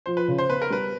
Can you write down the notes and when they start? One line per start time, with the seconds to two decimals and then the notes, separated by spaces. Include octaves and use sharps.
0.06 F3 C5
0.17 B4
0.28 C#3
0.39 C5
0.49 B3 B4
0.62 A#4
0.70 G3 B4